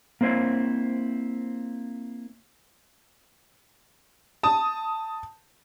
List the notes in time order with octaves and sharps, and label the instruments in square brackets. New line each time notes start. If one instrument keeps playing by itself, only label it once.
[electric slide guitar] A#3 C4 E4 C5 C#5
[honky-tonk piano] A5 D#6